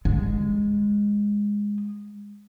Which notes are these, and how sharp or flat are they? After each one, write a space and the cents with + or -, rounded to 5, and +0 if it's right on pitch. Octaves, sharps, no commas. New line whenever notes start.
G#3 -15